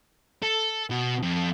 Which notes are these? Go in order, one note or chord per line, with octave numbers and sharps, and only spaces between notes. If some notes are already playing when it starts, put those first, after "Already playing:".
A4
B2
F2